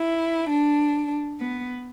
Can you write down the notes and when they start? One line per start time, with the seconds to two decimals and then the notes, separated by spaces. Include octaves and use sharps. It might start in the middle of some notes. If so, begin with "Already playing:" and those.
Already playing: E4
0.50 D4
1.39 B3